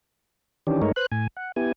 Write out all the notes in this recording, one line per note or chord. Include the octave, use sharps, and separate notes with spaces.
D#3 E3 C#4 D4 G4
G2 G#3 A3 D#4 A#4 C#5
B4 C5 F#6
A2 G#5
F#5
B3 E4 G4 G#5